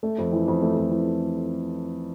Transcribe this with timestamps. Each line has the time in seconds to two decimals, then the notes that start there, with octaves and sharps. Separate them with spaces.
0.03 A3
0.18 F2
0.33 E3
0.48 F2
0.62 A3
0.77 F2
0.92 E3